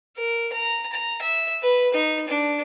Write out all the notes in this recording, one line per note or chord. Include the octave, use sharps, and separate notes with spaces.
A#4
A#5
A#5
E5
B4
D#4
D4